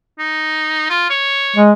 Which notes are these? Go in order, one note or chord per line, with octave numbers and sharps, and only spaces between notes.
D#4
F4
C#5
G#3